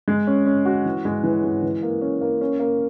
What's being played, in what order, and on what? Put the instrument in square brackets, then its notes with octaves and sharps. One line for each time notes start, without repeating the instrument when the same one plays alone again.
[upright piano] G#3
C#4
C#4
F#4
E3
G#3
E3
G#3
E3
A#3
C#4
A#3
C#4
A#3